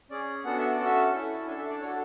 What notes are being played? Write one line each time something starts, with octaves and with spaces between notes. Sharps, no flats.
C#4 G#4 D5
B3 D4 F#4 A4 F#5
E5
D5
C#4 F#4 A4
E5
C#4 E4 A4
D4 A4 G#5
E5
D5
D4 F#4 A4 C#5